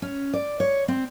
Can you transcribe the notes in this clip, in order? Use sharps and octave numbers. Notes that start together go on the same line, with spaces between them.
C#4
D5
C#5
C4